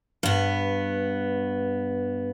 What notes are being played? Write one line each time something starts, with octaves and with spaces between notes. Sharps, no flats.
G2 B3